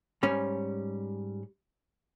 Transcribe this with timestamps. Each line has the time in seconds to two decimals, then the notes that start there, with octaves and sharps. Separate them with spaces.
0.23 G#2 G3 C#4